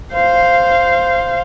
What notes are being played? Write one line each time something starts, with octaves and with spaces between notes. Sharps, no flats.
C5 F5